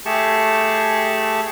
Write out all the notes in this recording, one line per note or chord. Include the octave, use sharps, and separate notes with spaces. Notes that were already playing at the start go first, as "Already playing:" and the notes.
A3 G4 G#4 A5 C#6